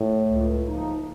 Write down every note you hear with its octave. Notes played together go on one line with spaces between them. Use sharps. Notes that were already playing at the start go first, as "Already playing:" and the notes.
Already playing: A2
C#2
C#3 F3 A#3 D#4